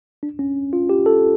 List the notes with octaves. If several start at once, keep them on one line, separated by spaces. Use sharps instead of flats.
D4
C#4
F4
G4
A4